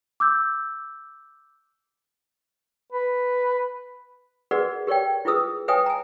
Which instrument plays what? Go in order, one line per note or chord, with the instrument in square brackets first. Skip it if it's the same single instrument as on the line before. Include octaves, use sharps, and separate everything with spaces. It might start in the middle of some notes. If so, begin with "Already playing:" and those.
[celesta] D6 E6 G6
[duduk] B4
[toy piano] F#4 G#4 A#4 B4 D5 F#5
G4 A#4 C#5 D5 G5
E4 F4 G#4 B4 D#6 E6
B4 C#5 E5 G5 G#5 D#6
G#5 A#5